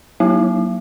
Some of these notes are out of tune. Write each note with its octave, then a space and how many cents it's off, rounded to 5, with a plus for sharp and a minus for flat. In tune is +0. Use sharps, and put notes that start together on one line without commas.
F#3 +0 A#3 +10 E4 +0